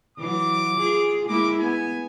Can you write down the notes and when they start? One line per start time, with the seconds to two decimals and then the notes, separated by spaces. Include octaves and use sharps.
0.18 E3 F#3 D6
0.79 F4 G#4
1.28 G#3 A#3 E4 D6
1.60 B3 G#5